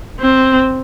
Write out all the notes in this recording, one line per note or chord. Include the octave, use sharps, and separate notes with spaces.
C4